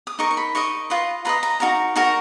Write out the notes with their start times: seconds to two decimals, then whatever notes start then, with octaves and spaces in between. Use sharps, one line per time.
0.07 D#6
0.19 D#4 A#4 D#5 C#6
0.31 C#6
0.37 B5
0.55 D#4 A#4 D#5 C#6
0.90 F4 B4 D#5
1.25 F4 B4 D#5 A#5
1.43 A#5
1.60 D#4 F#4 A#4 A#5
1.96 D#4 F#4 A#4 A#5